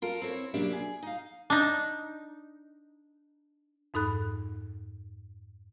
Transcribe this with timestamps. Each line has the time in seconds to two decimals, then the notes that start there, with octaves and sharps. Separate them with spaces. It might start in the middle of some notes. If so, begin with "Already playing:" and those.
0.02 F4 A4 A#4
0.22 C4 E4 C#5
0.54 B2 F#3 A#3 D4 G4 E5
0.73 G#4
1.03 D#4 F5
1.50 D4 D#4
3.94 F2 G#2 D#4 A4 B5 F#6